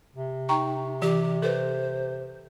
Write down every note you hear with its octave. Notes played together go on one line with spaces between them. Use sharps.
C3
D#4 G5 A#5 C#6
E3 G4
A4 B4 C5